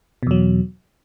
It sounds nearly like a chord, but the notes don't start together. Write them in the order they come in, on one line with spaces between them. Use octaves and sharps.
B2 E2 F#3